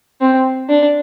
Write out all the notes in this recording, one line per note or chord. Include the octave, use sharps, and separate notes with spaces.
C4
D4